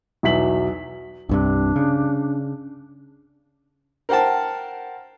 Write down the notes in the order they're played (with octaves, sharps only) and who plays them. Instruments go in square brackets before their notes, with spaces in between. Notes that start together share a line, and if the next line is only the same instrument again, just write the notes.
[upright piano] B1 E2 F#3 E5 B6 F#7
[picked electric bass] C2 G2 C3 [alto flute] D4
[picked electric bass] C#3
[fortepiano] A#4 C5 F#5 G5 A5